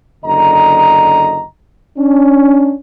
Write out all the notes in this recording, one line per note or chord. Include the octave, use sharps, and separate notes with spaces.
F#1 D3 D#5 A#5
C#4 D4